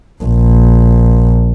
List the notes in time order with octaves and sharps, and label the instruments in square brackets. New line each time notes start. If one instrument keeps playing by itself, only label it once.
[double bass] A#1